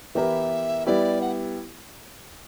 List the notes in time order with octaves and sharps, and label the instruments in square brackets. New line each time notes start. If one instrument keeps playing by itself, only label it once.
[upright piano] E3 B3 E4 G4 A#4 [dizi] E5
[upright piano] G3 B3 E4 G4 [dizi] D5
[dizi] F#5